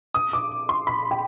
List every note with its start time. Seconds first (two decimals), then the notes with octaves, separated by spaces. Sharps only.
0.14 D#6
0.33 D6
0.69 C6
0.87 B5
1.11 G5